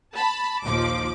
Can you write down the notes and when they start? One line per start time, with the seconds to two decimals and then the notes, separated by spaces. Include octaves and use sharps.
0.14 A5 B5
0.64 A#1 D#2 F3 D6